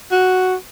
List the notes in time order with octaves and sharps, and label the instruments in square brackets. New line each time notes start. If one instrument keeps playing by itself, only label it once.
[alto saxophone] F#4